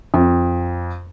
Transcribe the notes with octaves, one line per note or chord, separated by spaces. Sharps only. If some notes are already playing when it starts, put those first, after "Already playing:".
F2